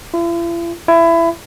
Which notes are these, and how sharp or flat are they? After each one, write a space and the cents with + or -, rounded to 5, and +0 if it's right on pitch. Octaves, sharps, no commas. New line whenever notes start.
E4 +45
E4 +20